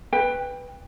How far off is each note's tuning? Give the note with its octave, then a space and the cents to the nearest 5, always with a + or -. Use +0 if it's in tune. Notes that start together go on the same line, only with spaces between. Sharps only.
B4 +0 G5 +20